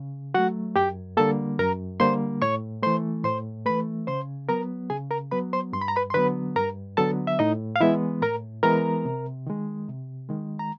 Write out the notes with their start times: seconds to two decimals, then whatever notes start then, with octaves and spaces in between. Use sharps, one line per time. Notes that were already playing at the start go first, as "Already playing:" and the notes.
Already playing: C#3
0.34 F#3 A3 F#4 F#5
0.76 F#2 G4 G5
1.17 D3 G3 A#3 A4 A5
1.59 F#2 A#4 A#5
2.00 D3 G3 A#3 C5 C6
2.42 A2 C#5 C#6
2.83 E3 A3 C5 C6
3.24 A2 C5 C6
3.65 E3 A3 B4 B5
4.07 C#3 C5 C6
4.49 F#3 B3 A#4 A#5
4.90 C#3 G#4 G#5
5.11 A#4 A#5
5.31 F#3 B3 B4 B5
5.53 C5 C6
5.73 G2 C6
5.81 B5
5.88 A#5
5.96 B4 B5
6.10 C6
6.14 D3 F#3 B3 B4 B5
6.56 G2 A#4 A#5
6.97 D3 F#3 B3 A4 A5
7.27 E5
7.39 A2 D#4 D#5
7.76 F5
7.80 E3 G#3 B3 E4 E5
8.22 A2 A#4 A#5
8.63 E3 G#3 B3 A#4 A#5
9.05 C3
9.47 D#3 G#3
9.88 C3
10.29 D#3 G#3
10.59 A#5